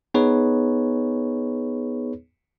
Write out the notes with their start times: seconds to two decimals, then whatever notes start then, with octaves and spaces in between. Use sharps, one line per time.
0.14 B3 D#4 G#4 B4 C#5